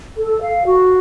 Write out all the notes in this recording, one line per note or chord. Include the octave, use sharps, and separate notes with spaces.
A4
F5
F#4